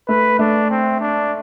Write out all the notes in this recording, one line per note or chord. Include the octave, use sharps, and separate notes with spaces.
A3 B4
A3 D4
C4
D4